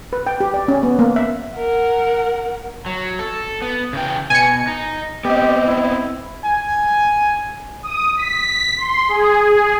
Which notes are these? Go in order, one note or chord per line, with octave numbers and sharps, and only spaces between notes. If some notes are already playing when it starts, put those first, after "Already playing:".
B4
G5
G4
D5
C#4
B3
A#3
E5
A#4 F#5
F#3
A4
B3
C#3 E3 G5
B2 G#5 C#7
D#4
B3 C4 G4 D#5
E4
G#5
D#6
B6
C6
G#4
G#4